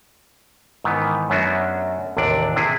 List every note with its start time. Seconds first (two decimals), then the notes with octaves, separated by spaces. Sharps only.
0.84 G#2 D#3 E3 B3
1.30 F#2 A3 B3 C#4 D4 F#4
2.17 A1 D#2 C3 D4 D5
2.56 C3 D4 E4 G#4